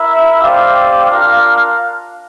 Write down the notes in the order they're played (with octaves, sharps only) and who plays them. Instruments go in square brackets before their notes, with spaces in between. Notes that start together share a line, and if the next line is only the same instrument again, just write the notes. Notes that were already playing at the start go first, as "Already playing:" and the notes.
Already playing: [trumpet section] E4 A#4 E5
C4 G4 D5 F5
D4 F4 A#4 F5